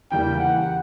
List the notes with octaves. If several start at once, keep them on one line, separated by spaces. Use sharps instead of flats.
E2 C#3 E3 G3 A#3 G5
F#5